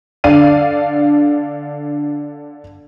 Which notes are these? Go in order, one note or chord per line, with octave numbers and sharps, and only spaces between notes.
D3 D5 F5 D#7